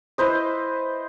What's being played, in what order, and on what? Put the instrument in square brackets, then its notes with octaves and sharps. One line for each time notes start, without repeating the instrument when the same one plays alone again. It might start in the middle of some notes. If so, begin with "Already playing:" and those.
[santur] E4 B4 C5 D#5